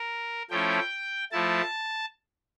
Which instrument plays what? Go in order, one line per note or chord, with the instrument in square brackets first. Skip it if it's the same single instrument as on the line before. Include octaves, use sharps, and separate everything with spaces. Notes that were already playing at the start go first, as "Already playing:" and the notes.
Already playing: [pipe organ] A#4
F3 A3 C#4 E4 G5
F3 A3 E4 A5